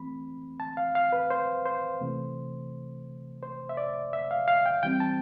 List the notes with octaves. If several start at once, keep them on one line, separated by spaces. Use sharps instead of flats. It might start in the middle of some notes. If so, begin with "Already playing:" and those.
Already playing: E3 A3 C4 B5
A5
F5
F5
B4
C5
C5
C3 E3 A3
C5
E5
D5
E5
F5
F5
G5
E3 G3 C4 G5
A5